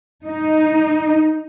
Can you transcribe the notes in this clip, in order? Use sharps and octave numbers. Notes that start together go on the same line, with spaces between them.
D#4